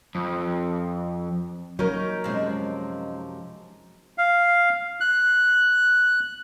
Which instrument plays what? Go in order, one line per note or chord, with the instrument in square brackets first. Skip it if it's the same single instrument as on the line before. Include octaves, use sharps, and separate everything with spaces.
[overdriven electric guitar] F2
[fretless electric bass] F#3 A#3 [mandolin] C#4 D#4 A#4
[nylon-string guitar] F#2 C3 F3 [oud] G#3 C4
[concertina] F5
F#6